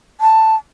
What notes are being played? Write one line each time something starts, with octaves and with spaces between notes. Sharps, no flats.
A5